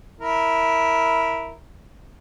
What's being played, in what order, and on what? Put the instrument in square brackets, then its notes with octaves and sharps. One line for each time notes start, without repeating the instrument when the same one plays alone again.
[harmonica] E4 A#4